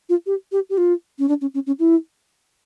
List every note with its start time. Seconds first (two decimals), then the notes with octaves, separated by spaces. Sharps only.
0.09 F4
0.26 G4
0.52 G4
0.70 G4
0.77 F4
1.19 C#4
1.28 D4
1.41 C#4
1.54 C#4
1.67 C#4
1.79 E4